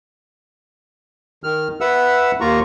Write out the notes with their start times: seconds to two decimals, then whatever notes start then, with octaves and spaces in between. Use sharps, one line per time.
1.44 D#3 F6
1.81 B4 E5 F#5 E6
2.41 D#2 A#3 F4 A#5 C#6